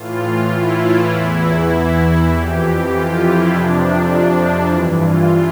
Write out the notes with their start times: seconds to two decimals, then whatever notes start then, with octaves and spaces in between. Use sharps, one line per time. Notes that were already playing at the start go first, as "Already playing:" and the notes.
Already playing: A2 E3 F4
0.52 E4
0.82 E4
1.12 E2 E3 E4
2.31 F2 E3 G4
2.91 F4
3.20 E4
3.50 F2 C3 F3 D4
4.10 D4
4.69 G2 E3 E4
4.99 F4